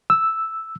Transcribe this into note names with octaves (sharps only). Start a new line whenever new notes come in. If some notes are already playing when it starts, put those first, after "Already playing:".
E6